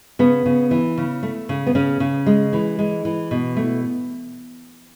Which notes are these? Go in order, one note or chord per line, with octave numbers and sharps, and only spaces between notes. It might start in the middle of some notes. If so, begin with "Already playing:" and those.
C#3 B3
C#3
E3
C#3
A3
C#3
B3
C#3 C#4
C#3
G#3
E3
G#3
E3
B2
A3